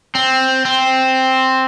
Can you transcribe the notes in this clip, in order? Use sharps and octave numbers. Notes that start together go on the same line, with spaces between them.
C4
C4